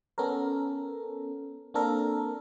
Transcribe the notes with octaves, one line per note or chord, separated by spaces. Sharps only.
B3 C#4 A4 A#4
A#3 C4 D4 A4 A#4